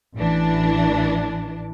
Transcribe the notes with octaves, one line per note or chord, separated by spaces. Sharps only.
A1 E3 D4